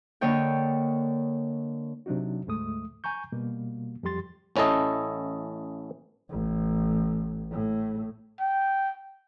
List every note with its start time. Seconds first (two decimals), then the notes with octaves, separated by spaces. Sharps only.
0.21 D3 A#3 C#5 D#5 G5
2.06 C3 F#3 D4 D#4 F#4
2.47 D2 G#2 G#3 A3 D#6
3.04 G#5 A#5 C#6 G6
3.32 B2 G3 A#3
4.03 F2 F3 G3 G4 C6 A6
4.56 A1 C#4 E4 A4 D#5
6.30 A1
7.51 A2
8.41 G5